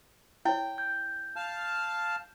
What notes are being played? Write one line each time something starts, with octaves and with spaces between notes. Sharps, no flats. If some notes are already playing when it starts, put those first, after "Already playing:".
E4 C#5 G5
G6
F5 A5 F6